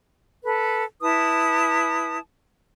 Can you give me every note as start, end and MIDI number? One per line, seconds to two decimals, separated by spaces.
0.44 0.84 69
0.44 0.84 71
1.02 2.18 64
1.02 2.18 71
1.02 2.18 81
1.02 2.18 87